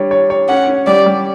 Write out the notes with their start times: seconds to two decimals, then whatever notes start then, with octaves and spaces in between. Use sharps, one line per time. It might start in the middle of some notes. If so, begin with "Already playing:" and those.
Already playing: G3 D4 C#5
0.11 C#5
0.30 C#5
0.48 C#4 F#5
0.67 C#4
0.87 G3 D5
1.06 G3